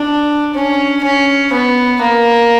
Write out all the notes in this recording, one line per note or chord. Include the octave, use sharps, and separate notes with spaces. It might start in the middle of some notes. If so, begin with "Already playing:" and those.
Already playing: D4
C#4
C#4
B3
A#3